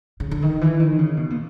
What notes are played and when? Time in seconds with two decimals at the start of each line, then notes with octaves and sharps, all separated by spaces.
0.20 C#3
0.31 D3
0.42 D#3
0.61 E3
0.80 D#3
0.99 C#3
1.17 B2
1.30 A#2